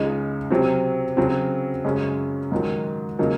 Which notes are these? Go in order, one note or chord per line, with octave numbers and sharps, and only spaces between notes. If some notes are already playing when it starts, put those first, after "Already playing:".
Already playing: C#2 C#3 G#3 D#4
C3 F#3 C4
C#3 F#3 C4
F#2 C#3 G#3 C#4
G#2 D#3 F#3
C#3 F#3 A#3 D#4